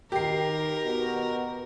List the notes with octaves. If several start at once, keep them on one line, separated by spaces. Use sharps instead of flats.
D#3 G4 A#4 C7
B2 B3 F#4